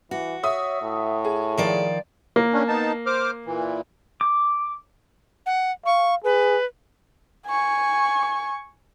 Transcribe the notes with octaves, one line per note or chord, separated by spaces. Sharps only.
E3 F#4
C#5 E5 D#6
A2
G#4
D#3 F3 D5
A#3
C#4 D4
B3 D#4 A5
C5 D6 F6
A#2 E3
D6
F#5
F5 C#6
G#4 B4
G#5 C#6